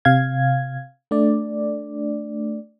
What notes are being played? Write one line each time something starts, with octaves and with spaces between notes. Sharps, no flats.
C3 F5 G#6
A3 D4 D5